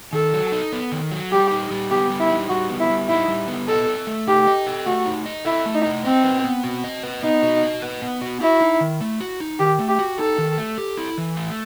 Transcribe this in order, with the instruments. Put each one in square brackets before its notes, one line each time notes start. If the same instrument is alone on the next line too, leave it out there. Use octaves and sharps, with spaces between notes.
[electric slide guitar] D#3 [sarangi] A4
[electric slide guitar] F#3
D#4
B3
D#3
F#3
[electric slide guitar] G3 [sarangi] G4
[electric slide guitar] D#4
G3
[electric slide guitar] B3 [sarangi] G4
[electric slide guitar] G3
[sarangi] E4
[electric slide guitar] D#4
[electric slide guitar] G3 [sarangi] F#4
[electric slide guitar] B3
[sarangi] E4
[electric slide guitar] G3
[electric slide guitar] D#4 [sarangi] E4
[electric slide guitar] G3
B3
[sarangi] A4 [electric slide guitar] D#5
[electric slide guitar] A4
A3
[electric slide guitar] D#4 [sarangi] G4
[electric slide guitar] D#5
A4
[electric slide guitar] A3 [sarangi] F#4
[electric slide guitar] D#4
D#5
[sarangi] E4 [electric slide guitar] A4
[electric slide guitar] A3
[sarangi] D#4
[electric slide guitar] D#4
[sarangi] C4 [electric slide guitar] D#5
[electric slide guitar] B4
B3
F#4
D#5
B4
[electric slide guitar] B3 [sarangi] D#4
[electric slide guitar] F#4
D#5
B4
B3
F#4
[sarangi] E4 [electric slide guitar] F#4
[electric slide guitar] D#4
D#3
A3
F#4
D#4
[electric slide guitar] D#3 [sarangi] G4
[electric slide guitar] A3
[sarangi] G4
[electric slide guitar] F#4
[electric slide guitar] D#4 [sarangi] A4
[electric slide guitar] D#3
A3
G4
E4
E3
A3